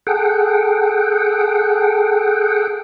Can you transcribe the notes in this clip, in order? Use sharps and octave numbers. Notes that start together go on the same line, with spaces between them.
G#4 A4 F#5 G5